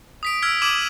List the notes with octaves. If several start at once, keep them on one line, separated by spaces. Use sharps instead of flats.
D#6 B6 D7
E6 F6 G#6 B6 D7
D6 D#6 G#6 D#7 E7 F#7